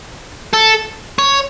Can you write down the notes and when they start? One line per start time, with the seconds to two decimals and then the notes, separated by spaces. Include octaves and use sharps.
0.54 A4
1.19 C#5